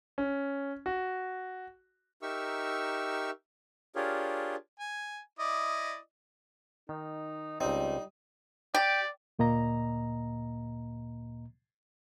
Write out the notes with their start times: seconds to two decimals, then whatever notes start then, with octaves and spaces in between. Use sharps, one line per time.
0.18 C#4
0.86 F#4
2.22 D#4 G4 A#4 E5 C#6 E6
3.96 D4 F4 G4 G#4 A#4 C#5
4.80 G#5
5.39 E4 D5 D#5
6.89 D#3 D#4
7.61 C#2 G3 C4 D#4
8.74 G4 D5
9.39 D2 A#2 A#3 D#5 A#5